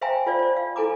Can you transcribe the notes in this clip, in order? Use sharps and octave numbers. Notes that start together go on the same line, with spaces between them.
C5 E5 F5 G5 G#5 A#5
F4 C5 D5 F5
C5 D5
F5
E4 A4 G#5 A#5 D6